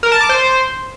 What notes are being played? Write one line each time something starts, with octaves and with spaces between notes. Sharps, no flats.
A#4
A5
D6
C5